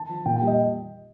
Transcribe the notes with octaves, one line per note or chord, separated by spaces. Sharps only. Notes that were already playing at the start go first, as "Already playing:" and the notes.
Already playing: A5
F3
A#2 G5
G5
G3
D#5